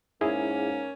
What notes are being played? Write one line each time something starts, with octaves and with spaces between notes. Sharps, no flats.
G#2 A#3 C#4 E4 G#4